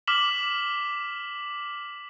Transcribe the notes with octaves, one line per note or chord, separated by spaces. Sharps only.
D6 F6 B6 E7 F#7